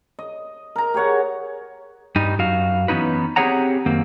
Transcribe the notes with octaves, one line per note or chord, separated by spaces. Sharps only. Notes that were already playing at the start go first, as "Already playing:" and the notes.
D#5
A#4 A#5
G4 G#4 C#5 F#5
G2 G3 D#4
F#2 F#4 F5
E3 B3 C#4 D#4 B4
C4 G4 G#4 C#5 F#5 A#5
F#2 D#3 A#3 C4